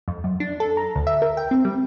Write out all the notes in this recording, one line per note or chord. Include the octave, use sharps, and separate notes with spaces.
F2
F#2
D4
A4
A#5
D2
E5
A#4
G5
C4
G3